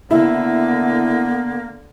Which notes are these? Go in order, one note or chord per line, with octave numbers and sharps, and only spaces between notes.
D3 A#3 B3 E4